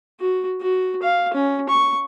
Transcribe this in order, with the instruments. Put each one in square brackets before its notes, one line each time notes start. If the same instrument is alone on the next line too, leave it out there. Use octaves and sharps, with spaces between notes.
[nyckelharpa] F#4
F#4
F5
C#4
C#6